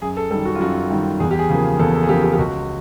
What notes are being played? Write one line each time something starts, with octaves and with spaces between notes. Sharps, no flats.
F#2 G#4
A4
D#3 G3 A4
F#4
F4
F#2 F#4
D#3 G3
E2 G#4
G4
G#4
C#3 F3 A#3
E2 A4
A4
G#4
C#3 F3 A#3 G4
G4
G4
C#2 F#4